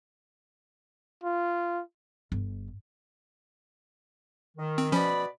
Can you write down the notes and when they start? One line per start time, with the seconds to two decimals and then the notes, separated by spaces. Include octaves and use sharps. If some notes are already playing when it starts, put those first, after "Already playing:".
1.24 F4
2.32 G1
4.57 D#3
4.78 C4
4.92 B2 F3 C#4 D5 B5